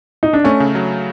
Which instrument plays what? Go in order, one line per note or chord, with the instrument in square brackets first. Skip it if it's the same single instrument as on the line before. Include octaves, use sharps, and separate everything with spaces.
[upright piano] D#4
D4
[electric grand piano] A3 [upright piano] C#4
[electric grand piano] C#3
F#3